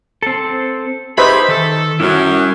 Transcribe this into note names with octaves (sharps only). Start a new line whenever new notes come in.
C4 A4
D#4 G4 G#4 B4 C5 E5 B5
D#3 A4
F#2 G3 C#4 E4